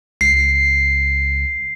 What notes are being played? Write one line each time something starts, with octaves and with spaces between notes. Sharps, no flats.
C#2 C7